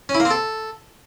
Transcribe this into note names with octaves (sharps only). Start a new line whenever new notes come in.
C#4
E4
A#3
C4
A4